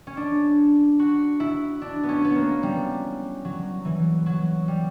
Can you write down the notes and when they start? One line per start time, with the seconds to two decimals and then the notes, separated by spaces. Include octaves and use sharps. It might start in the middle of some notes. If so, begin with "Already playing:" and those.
0.07 C#4
0.17 D4
0.99 F#4
1.40 E4
1.82 D4
2.03 B3
2.09 C#4
2.25 B3
2.36 A#3
2.63 G3
3.45 F#3
3.85 E3
4.26 F#3
4.68 G3